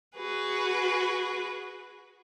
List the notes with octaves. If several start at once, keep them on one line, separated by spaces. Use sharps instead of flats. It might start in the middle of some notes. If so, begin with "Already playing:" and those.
F#4 G#4 B4